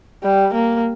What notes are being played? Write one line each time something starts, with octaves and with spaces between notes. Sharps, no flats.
G3
A#3